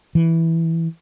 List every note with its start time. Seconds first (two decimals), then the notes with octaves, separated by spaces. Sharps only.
0.15 E3